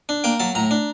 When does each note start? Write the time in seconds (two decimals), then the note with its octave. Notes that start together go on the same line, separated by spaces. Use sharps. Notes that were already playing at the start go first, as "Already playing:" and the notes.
0.09 D4
0.24 A#3 G5
0.40 F#3 A5
0.55 A2 A#5
0.71 D4